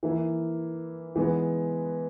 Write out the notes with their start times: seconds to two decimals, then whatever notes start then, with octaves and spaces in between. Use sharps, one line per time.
0.03 E3 A#3 E4
1.16 E3 G#3 B3